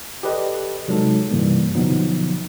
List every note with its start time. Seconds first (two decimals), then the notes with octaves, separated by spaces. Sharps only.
0.23 G4 A4 B4 D5 D#5
0.88 C3 F#3 G#3 D#4 A4
1.31 G2 C3 E3 G3 A#3
1.75 B2 D3 F3 F#3 B3 D#4